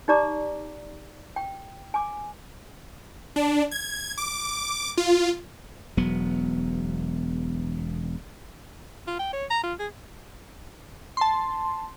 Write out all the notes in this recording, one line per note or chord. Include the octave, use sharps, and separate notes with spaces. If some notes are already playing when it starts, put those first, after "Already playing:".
D#4 G4 D5 A#5 D6
G5
G#5 D6
D4
G#6
D6
F4
E1 F#3 B3
F4
G5
C#5
A#5
F4
G#4
A5 C6